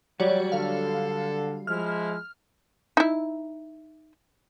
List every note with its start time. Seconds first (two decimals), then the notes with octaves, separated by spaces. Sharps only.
0.20 F#3 G3 F#4 C#5 D5
0.52 D3 A4 F5
1.67 F3 G#3 E4 F6
2.97 D#4 E4